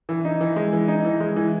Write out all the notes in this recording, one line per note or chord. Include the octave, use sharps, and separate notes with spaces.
E3
D#4
E3
G#3
E3
D#4
E3
G#3
E3